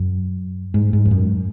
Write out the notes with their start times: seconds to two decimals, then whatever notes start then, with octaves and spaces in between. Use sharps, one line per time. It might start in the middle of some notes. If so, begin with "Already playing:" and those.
Already playing: F#2
0.74 G#2
0.93 G#2
1.05 E2
1.11 F#2